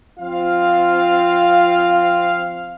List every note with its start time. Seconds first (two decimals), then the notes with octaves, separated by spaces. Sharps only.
0.19 F3 C4 F4 F5